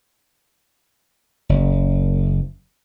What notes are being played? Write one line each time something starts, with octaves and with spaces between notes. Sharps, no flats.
F#1